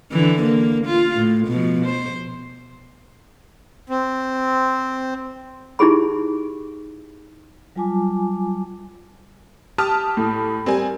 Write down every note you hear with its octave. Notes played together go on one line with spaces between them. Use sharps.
D3 E3
A#3
F4
A2
B2 F3
C5
C4
D#4 E4 G4 G#4 B5
F#3 G3 F4 G#5 A5 D6
G4 A5 D#6 F6
A2
G3 C4 A#4 G#5